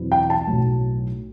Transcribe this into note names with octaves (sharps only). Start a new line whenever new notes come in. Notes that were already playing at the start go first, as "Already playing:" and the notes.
Already playing: E2 B2 F#3 C4 E4
G5
A5
B1 A2 F#3